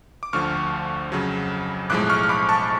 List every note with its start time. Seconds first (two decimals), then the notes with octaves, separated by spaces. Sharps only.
0.23 D6
0.33 D2 D3 F3 C#6 F6
1.12 F2 C#3 F#3
1.90 B1 A2 F3 G#3 D6 F#6
2.10 C#6 F6
2.23 F6
2.29 B5 D6
2.49 A5 C#6